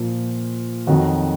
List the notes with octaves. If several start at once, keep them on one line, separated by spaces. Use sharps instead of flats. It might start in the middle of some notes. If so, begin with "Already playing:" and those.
Already playing: A#2 F3
F2 D#3 F#3 F#4